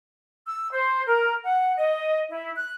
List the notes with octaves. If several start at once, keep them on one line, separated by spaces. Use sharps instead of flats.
E6
C5
A#4
F#5
D#5
E4
F#6